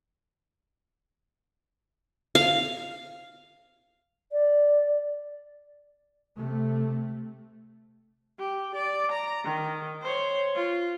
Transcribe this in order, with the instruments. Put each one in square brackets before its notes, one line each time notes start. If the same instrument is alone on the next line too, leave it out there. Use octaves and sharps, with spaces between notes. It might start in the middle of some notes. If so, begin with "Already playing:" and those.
[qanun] F5
[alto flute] D5
[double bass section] C3 A3
[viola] G4
D5
A#5
D#3
C5 C#5
F4